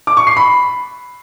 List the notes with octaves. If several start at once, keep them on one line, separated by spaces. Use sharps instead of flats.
D6
C#6
C7
B5